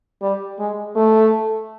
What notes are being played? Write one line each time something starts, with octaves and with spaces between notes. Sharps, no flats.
G3
G#3
A3